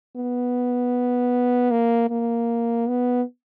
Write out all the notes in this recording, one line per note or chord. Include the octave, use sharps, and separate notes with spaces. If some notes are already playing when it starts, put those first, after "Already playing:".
B3
A#3
A#3
B3